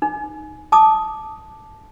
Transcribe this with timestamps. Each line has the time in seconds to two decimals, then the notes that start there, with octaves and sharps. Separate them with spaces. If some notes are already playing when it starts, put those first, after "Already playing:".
0.02 D#4
0.72 A5 D6 D#6